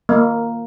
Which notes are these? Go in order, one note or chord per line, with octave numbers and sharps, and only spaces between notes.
A#3